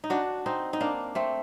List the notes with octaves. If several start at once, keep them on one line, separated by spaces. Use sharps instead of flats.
D#4
D4 F#4
C4 D#4
D#4
A#3 D4
A3 C4